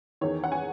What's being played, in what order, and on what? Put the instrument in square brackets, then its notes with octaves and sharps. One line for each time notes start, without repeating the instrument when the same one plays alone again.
[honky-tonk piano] E2 D#3 C#5
F#5
G#5